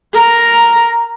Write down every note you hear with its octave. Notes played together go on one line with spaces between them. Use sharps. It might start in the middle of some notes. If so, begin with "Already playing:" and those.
A#4 A#5